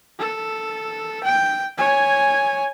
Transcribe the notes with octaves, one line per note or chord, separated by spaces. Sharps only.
A4
G5
C#5 G#5